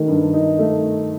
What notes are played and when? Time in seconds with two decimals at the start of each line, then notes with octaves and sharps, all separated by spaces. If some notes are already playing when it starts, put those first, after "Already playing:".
Already playing: D#3 A3
0.08 G2
0.34 D#4
0.59 A3